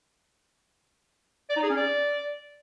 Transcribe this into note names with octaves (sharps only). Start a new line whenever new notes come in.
D5
D#4
G#4
C#4
D5